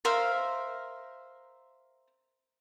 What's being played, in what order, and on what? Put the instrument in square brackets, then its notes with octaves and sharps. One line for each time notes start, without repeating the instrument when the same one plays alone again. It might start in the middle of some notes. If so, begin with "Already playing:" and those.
[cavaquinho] A#4 C5 E5 F5